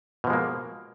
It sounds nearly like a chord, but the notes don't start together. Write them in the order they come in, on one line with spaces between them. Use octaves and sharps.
B2 F3 G#3 A#3